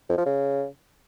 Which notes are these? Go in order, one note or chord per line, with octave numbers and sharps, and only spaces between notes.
F2
F3
C#3